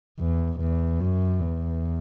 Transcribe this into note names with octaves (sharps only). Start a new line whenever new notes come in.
E2
E2
F#2
E2